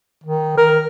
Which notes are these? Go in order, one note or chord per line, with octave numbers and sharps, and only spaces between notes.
D#3
A#4